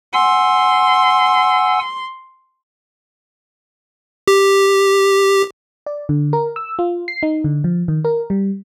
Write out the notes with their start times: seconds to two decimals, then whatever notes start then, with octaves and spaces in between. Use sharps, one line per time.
0.13 F#5 G#5 C6 E6
4.28 G4
5.86 D5
6.09 D3
6.33 A#4
6.56 E6
6.79 F4
7.08 C7
7.23 D#4
7.44 D3
7.64 F3
7.88 D#3
8.05 A#4
8.30 G3